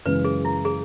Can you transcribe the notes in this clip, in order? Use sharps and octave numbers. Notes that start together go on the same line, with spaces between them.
F#2 C#3 E3 G#3 B4
G#4
E4
G#4